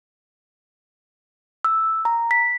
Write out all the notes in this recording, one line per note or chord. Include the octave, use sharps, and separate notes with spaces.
E6
A#5
B6